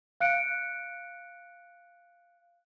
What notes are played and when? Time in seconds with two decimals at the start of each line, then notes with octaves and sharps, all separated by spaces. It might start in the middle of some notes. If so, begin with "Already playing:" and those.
0.20 F5 F#6 C#7 D7